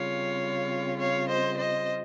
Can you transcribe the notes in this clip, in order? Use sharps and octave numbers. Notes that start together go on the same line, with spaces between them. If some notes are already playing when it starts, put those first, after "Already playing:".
Already playing: C#3 G3 C4 F4 C#5 F5
C#5 F5
C5 D#5
C5 D#5